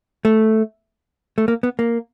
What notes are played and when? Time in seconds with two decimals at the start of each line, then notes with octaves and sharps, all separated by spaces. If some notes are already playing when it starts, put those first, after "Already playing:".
0.25 A3
1.38 A3
1.48 A#3
1.63 B3
1.79 A#3